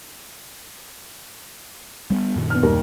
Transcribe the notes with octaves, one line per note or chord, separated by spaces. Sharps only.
G3 A#3 B3
F#2 A#2 D#3
B3 D4 F6
D#2 G3 A#4